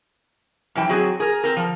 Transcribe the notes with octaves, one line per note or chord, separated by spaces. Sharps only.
F#2 E3 E4 G5
F#3 C4 F#4 G#4
G#4 A#4
C4 A#4
F3